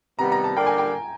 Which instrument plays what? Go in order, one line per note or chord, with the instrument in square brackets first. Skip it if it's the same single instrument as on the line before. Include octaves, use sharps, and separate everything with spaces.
[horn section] C3 D#3 G3 B3 [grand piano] A#5
[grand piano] A#5
A5
[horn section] D3 G3 A#3 D4 G4 [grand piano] G5
[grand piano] G#5
G5